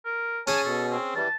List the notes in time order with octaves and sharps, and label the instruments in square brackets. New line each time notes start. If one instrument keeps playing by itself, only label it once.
[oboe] A#4
[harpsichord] C#4 G#4 [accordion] C#5 G#5 A5
[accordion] B2 [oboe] A4
[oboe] C4
[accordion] E3 G3 [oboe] A5